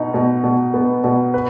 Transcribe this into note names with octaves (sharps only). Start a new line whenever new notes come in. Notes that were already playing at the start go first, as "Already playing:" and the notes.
Already playing: B2 D#4
B2
B2
B3
B2
B4